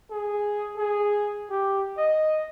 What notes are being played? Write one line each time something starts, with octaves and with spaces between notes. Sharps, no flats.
G#4
G#4
G4
D#5